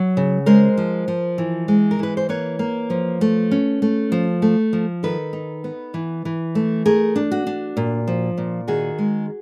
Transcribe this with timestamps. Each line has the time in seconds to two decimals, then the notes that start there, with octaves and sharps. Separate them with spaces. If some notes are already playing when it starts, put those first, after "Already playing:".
Already playing: F#3
0.17 C#3
0.46 G#3 A#4 C5
0.77 F3
1.08 F3
1.38 E3
1.68 G#3
1.91 A#4
1.99 E3 B4
2.17 C5
2.29 A#3 B4 C#5
2.59 A#3
2.90 F3
3.21 A3
3.51 C#4
3.82 A3
4.12 F3
4.42 A3
4.73 F3
5.03 D#3 A4 B4
5.33 D#4
5.64 B3
5.94 E3
6.25 E3
6.55 A3
6.86 A3 G#4 A#4
7.16 D4
7.31 F#4
7.47 D4
7.77 A#2
8.08 F3
8.38 A#2
8.68 D#3 F#4 G#4
8.99 G#3